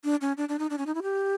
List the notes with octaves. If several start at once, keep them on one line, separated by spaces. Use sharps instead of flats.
D4
C#4
D4
D4
D#4
D4
C#4
D#4
E4
G4